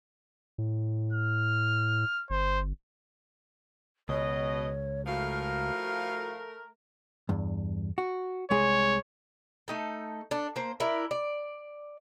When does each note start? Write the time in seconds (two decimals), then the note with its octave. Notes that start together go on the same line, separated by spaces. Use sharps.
0.58 A2
1.13 F6
2.30 G1 C5
4.09 C#2 B2 C#5 D#5
5.07 A2 F3 A3 F#4 A#4 F5
7.29 E2 G2
7.98 F#4
8.51 C2 G#3 G#4 C#5
9.68 A3 D#4 A4
10.31 D4 A4
10.56 A#3 C5
10.80 D4 E4 A#4
11.11 D5